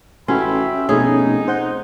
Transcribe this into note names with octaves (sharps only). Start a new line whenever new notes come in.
A1 C#4 F#4 E5 G5 B5 C6
F1 B2 A3 C#4 D#4 G#4
C5 F#5 G6